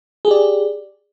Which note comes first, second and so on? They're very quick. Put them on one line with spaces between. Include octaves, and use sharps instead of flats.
G#4 G4 D5